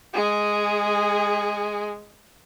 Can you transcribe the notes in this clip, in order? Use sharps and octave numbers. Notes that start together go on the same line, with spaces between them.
G#3 G#4